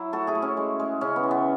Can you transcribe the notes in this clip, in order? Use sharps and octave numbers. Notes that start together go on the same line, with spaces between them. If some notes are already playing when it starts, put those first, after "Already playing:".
Already playing: F#3 E4
A3 F#4 A4
E4 G#4
A3
C#4
G#3
G#3
C#3 C#4
B3
E3
B3